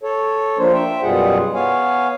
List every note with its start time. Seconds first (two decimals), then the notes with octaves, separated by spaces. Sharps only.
0.03 A4 C#5
0.58 F3 A#3 D4 C5
0.73 E5 G5
1.03 F#2 B2 G3 F4 G#4 F#5
1.55 B3 C#5 F5 G#5